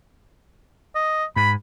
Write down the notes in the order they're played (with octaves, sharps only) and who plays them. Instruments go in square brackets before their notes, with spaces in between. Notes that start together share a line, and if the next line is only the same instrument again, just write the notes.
[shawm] D#5
[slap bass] G#2 [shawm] B5